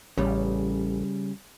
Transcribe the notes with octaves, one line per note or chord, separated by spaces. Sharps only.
A1 C#3 G3